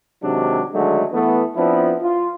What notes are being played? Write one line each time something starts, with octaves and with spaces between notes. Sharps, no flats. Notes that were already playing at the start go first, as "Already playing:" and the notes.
C3 D#3 F#3 G#3 D4
D3 D#3 F#3 G#3 A3
E3 A3 B3
F3 B3 C4 D4 E4
F4